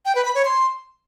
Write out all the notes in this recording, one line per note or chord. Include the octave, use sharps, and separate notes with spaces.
G5
B4
B5
C#5
C6